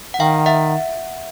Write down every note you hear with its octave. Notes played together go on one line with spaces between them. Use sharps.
F#5
D#3 F5 G5
E5 F#5